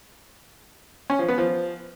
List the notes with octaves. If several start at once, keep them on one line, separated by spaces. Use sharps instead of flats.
C#4
F3
B3
F3